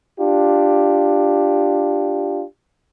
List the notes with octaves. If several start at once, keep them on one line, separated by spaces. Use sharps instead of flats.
D4 F4 G4